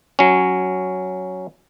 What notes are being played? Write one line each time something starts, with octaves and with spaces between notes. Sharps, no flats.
F#3 C#4